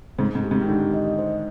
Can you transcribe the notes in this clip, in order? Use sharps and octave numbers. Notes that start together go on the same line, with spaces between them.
G#2 C5
G#2
G4
G#2
D#3
D3 G4
D#5
C5